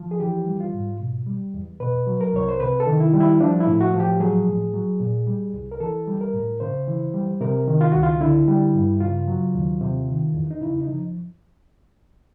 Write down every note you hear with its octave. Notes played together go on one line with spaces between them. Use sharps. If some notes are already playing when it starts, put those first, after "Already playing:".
Already playing: F3
G#4
E3 G4
G3
F4
G#2
B2
G3
E2
B2 B4
F#3
A#4
C2 C#5
C5
C3 B4
A4
D#3
E4
G3
E4
F3 D4
E4
A2
F#4
F3
G4
F#3 G#4
A2
F#3
A#2
G3
C2
A#4
E3 A4
G3
A#4
A2
C#3 C5
E3
G3
C3 A#4
D#3
F4
C#2 F#4
F4
D3 E4
G3
G2
C#3 F4
F#3
D#2
C3
D#3
E2
D#4
C#3 E4
D#4
F3